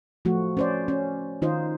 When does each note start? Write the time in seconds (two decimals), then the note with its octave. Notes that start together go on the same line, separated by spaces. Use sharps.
0.25 F3 A3 F#4
0.57 C#4 C5 D5
0.88 C#4
1.42 D#3 D#4 F4 C5 D#5